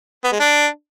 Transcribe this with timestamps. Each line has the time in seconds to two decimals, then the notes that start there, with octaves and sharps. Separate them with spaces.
0.24 B3
0.32 G#3
0.40 D4